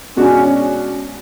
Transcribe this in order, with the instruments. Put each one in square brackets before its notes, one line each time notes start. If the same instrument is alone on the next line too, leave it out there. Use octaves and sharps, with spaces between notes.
[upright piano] B2 G#3 D4 F#4 [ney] C#4